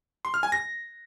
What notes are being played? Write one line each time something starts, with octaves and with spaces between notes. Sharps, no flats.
C6
F6
G#5
A#6